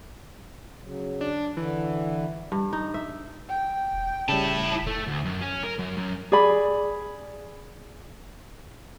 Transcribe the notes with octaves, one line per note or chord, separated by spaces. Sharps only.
C#3 F#3
D4
D3 E3
G2
D#4
E5
G5
E1
C#3 G3 E4 A5
A3
D2
F#2
C#4
A#4
F#2
F#2
G#4 D5 B5